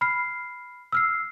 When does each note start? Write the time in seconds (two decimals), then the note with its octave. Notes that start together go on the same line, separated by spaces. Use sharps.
0.01 B5 F6 C7
0.92 E6 F6 C7